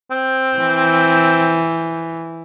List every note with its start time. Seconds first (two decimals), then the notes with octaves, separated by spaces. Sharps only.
0.11 C4
0.58 E3